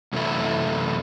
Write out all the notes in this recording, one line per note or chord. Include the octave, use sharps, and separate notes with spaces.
F#2 C3 E3 A3 E4